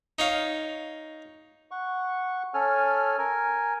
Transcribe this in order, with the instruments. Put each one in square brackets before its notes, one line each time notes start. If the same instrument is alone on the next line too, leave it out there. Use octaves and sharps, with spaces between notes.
[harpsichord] D#4 C#5 F5
[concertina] F#5 C#6
C#4 A4 G#5 F6
A#4 G#5